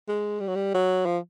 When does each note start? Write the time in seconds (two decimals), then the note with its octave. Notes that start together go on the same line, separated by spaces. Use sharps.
0.08 G#3
0.40 G3
0.48 F#3
0.56 G3
0.74 F#3
1.06 F3